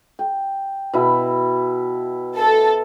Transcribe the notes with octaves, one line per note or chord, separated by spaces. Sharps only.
G5
B2 E4 B4
A4